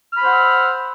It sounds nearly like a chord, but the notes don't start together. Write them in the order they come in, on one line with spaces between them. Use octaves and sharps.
F6 B5 C5 F#5 E6